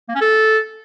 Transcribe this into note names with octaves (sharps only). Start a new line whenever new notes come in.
A#3
C#4
A4